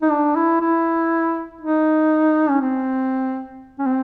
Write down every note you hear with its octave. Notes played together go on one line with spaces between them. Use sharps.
D#4
D4
E4
E4
D#4
C#4
C4
C#4
C4